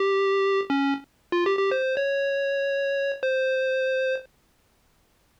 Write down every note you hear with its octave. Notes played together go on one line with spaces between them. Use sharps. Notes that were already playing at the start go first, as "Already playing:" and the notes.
Already playing: G4
C#4
F4
G4
G4
C5
C#5
C5